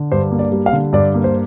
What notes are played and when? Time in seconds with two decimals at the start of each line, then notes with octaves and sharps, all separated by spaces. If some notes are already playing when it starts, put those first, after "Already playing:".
Already playing: D3
0.12 G2 C5
0.31 A#3
0.39 D5
0.52 G3
0.66 F5
0.73 D3
0.93 G2 D5
1.14 A#3
1.24 C5